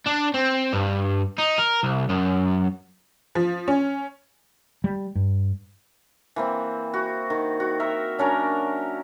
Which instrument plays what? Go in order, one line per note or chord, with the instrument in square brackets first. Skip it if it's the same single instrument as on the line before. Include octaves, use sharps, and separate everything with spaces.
[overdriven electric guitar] D4
C4
G2
D#4
A#4
C2
F#2
[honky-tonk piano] F3
C#4
[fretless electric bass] G3
G2
[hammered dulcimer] E3 A#3 C4
F#4
D#3
F#4
A#4 E5
F#3 C#4 D4 A#4